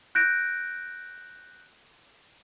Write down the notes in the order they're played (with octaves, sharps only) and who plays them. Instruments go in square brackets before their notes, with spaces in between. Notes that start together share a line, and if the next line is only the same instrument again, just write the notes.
[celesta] F#6 G6 A#6 D7